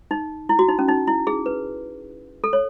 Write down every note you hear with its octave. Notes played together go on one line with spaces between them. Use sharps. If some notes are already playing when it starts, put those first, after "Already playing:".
D#4
E4
F#4
D#4
C#4
D#4
E4
G#4
B4
A4
C#5